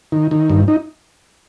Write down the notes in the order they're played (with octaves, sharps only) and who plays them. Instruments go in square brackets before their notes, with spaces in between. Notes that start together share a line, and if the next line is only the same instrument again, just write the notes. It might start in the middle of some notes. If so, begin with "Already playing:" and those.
[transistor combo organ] D#3
D#3
G2
D#4